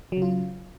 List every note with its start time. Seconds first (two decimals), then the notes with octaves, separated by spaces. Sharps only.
0.12 F#3
0.17 C#3
0.22 F4